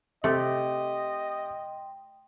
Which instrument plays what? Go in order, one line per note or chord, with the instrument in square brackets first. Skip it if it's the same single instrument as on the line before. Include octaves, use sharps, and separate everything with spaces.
[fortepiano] C3 G4 [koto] A3 [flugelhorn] D#5 [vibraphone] G5 C6